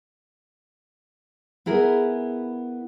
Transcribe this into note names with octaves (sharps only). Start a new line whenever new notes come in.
B3 E4 G#4 A#4